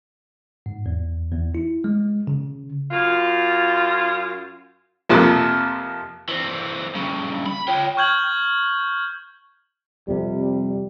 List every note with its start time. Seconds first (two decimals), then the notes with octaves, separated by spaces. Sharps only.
0.66 G#2
0.86 E2
1.32 E2
1.55 E4
1.84 G#3
2.27 C#3
2.91 F#2 F4
5.09 F2 C3 F3 A#3
6.29 E3 C4
6.95 G2 C#3
7.46 B5
7.68 F4 C#5 G5
7.97 C#6 F6 G6 G#6 F#7
10.08 F2 C3 G3